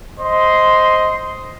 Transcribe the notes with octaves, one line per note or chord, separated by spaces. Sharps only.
C5 D#5 C6